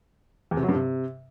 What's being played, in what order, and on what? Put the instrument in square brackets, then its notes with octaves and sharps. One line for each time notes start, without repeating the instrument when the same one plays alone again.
[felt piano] E2
C3
F#3
G2
C3